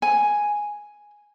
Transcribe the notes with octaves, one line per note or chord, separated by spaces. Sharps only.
G#5